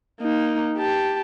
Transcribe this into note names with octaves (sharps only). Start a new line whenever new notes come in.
A#3 D#4
G4 A5